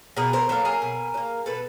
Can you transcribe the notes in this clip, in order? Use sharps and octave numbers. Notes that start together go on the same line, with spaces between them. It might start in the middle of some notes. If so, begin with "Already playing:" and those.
B2 G#4 A#4
A#4 C5
F#3 A#3 A4 B4
G#4 A#4
B2
F#3
A#3
B2 A4 B4